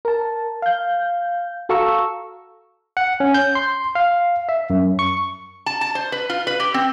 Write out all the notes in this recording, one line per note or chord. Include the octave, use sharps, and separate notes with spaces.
A#4 A5
F5 G6
F#4 A4 F5 A#5 C#6 E6
F#5
C#4
G6
C6
F5
E5
F#2
C#6
A5
A5
C5
B4
F4
B4
G4
C4